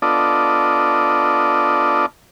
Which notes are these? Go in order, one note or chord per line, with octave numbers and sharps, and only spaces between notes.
B3 D4 F4 A4 D5 D#5